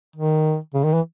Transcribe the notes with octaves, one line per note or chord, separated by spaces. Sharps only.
D#3
C#3
D#3
E3